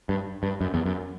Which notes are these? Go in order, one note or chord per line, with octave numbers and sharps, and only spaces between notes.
G2
G2
F#2
E2
F#2